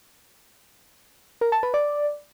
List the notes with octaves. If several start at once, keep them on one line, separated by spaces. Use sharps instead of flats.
A#4
A5
B4
D5